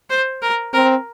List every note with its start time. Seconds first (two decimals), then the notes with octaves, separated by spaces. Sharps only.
0.10 C5
0.42 A#4
0.73 C4 A#4